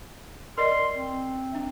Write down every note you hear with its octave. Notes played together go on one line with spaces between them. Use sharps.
A#4 D5 D#5 C6
C4
D4 E5